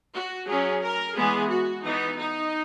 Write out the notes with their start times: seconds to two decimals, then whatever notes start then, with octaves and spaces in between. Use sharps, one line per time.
0.13 F#4
0.47 F#3 C#4 G#4
0.81 A#4
1.15 E3 G#3 B3 G#4
1.49 F#4
1.83 E3 B3 D#4
2.17 D#4